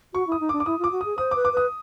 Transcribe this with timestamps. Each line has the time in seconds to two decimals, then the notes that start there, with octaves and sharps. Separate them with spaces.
0.14 F#4 C#6
0.27 E4 D#6
0.40 D#4
0.49 D6
0.53 D4
0.60 D6
0.66 E4 D#6
0.79 F4 D6
0.92 F#4
1.01 G#4 D#6
1.18 C5 D#6
1.31 D6
1.36 B4
1.45 D6
1.53 B4 D#6